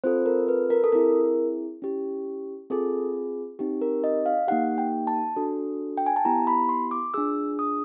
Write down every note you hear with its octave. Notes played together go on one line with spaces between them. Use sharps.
C4 F4 A4 C5
A#4
B4
A#4
A4
C4 E4 G#4 A#4
C#4 E4 G4
C4 F4 G#4 A4
C4 D#4 G4
A#4
D#5
F5
A#3 D#4 G4 F#5
G5
A5
D4 F#4 A4
G5
G#5
A5
B3 E4 G4 A#5
B5
C6
D6
D4 F4 G#4 E6
D#6